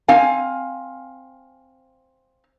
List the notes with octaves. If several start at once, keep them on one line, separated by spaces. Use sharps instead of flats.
C4 F5 G#5